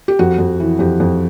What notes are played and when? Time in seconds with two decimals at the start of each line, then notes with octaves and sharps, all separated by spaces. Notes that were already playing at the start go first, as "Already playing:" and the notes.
0.08 G4
0.19 F2 F#4
0.39 F2
0.60 E3
0.79 F2 G4
1.00 F2